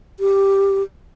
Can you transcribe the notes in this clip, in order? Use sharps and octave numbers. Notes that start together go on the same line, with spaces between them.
G4